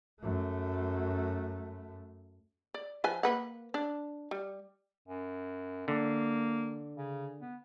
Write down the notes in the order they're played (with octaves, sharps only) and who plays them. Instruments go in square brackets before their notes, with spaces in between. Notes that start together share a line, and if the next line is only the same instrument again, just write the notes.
[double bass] F#2 A3
[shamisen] D5
F3 B4 G#5
A#3 B4 F#5
D4
G3
[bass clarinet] F#2
[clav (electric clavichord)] D3 [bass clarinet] A#3
[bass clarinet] C#3
B3